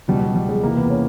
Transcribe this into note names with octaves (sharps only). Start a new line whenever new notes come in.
C#2 B2 G3
G3
G3
G#3
E2 C3 E3 A#3
B3
C#4